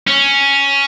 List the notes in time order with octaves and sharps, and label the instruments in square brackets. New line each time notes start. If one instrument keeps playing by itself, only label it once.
[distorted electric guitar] C#4